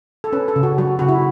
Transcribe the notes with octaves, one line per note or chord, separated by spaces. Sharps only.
A4
C#4 B4
A4
C#3
F#4
F#3 F#4
C#3 F#4
E4